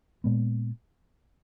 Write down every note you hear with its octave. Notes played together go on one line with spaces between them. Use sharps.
A#2 G#3 B3